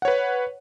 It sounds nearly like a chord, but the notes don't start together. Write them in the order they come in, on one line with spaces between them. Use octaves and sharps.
F#5 C#5 B4